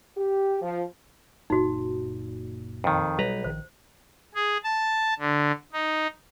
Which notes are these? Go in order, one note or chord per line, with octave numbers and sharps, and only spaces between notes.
G4
F3
F#1 A#2 D#4 F#4
F2 D#3
B1 G3 B4 A#5
A#1 D#3 C5
G#4
A5
D3
D#4